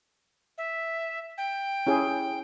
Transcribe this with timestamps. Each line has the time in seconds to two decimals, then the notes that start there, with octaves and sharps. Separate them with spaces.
0.58 E5
1.38 G5
1.87 C#4 E4 G#4